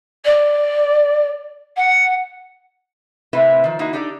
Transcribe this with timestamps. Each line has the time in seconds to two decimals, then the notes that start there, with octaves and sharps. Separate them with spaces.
0.25 D5
1.76 F#5
3.33 A2 C3 C4 E4 B4 E5
3.64 D#3 F3
3.79 A#3 D#4 E4 F#4
3.93 D4 D#4 G4 A4 D5